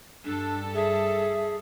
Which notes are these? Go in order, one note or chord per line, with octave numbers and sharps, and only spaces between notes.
G2 G3 D4 A4
G#4 E5